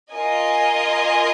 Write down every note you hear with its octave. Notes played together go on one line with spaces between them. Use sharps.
F4 A#4 D#5 G#5